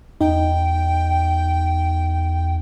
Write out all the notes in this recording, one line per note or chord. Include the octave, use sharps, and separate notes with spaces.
E2 D#4 G5